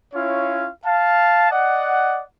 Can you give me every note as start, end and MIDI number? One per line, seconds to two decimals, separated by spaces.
0.14 0.68 61
0.14 0.68 64
0.14 0.68 65
0.14 0.68 73
0.14 0.68 77
0.85 1.50 77
0.85 1.50 81
1.50 2.21 74
1.50 2.21 75
1.50 2.21 78